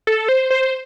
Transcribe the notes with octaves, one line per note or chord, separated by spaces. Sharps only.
A4
C5
C5